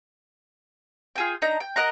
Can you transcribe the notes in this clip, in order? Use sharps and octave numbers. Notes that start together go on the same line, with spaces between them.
F4 G#4 G5
D4 D#4 A#5
G5
A#4 D#5 F#5 A#5